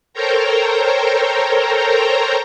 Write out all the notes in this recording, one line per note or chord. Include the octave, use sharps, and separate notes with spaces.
A4 A#4 C5 C#5 G5 A#5